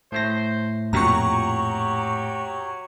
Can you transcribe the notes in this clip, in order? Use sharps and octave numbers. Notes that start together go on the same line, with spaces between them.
A2 A3 C5 A#6
F2 A#2 F#3 G4 A#5 C#6